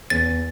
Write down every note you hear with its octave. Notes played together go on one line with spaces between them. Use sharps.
E2 A6